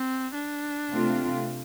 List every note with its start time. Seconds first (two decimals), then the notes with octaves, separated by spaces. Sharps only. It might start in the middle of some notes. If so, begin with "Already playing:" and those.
Already playing: C4
0.35 D4
0.91 C3 A3 C4 F4